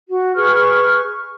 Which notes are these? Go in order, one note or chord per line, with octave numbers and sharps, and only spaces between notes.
F#4
G#4 B4 C#6 F6